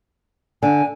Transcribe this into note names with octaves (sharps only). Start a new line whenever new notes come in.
D3 G#5